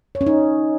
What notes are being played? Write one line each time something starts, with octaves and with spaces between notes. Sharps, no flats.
C#5
C#4
D#4